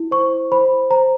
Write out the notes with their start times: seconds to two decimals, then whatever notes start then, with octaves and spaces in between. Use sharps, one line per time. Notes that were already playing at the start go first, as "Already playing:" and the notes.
Already playing: E4
0.11 C5 C#6
0.52 C5 B5
0.90 C5 A#5